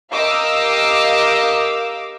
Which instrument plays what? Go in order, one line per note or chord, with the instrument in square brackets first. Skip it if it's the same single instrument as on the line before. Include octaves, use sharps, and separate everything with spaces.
[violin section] G4 A#4 D#5 F5 D6 E6